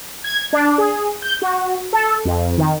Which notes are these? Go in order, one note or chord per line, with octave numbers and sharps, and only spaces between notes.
G#6
D4
G#4
G6
F#4
A4
F2
D#3